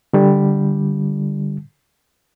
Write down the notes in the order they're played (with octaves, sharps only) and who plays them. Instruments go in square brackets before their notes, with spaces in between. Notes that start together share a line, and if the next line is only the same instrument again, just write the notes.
[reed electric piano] D3 G3